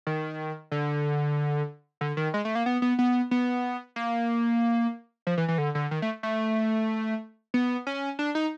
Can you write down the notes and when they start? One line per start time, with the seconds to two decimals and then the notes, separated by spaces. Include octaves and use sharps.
0.07 D#3
0.71 D3
2.01 D3
2.17 D#3
2.34 G#3
2.45 A3
2.55 A#3
2.66 B3
2.82 B3
2.99 B3
3.31 B3
3.96 A#3
5.27 F3
5.38 E3
5.48 E3
5.58 D3
5.75 D3
5.91 D#3
6.02 A3
6.23 A3
7.54 B3
7.87 C#4
8.19 D4
8.35 D#4